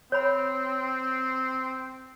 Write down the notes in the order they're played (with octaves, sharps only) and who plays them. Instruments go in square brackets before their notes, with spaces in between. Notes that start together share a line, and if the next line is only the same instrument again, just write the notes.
[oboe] C4 [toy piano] C#5 B5